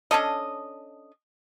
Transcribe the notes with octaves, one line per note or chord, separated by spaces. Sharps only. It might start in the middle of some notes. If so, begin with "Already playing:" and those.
C#4 D4 A4 D#5